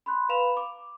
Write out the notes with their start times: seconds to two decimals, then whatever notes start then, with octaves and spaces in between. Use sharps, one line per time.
0.06 B5 C6 F#6
0.29 B4 F5 A#5 B5 E7 F7
0.57 D6